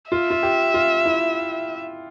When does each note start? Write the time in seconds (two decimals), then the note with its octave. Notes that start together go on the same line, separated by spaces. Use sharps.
0.11 F4 E5
0.31 F4
0.43 G4
0.74 F4
1.05 E4